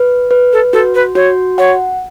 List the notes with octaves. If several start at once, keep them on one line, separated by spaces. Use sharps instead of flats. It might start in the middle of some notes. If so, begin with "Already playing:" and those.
Already playing: B4
B4
A4
F#4 A4
B4
F#4 C#5
C#5 F#5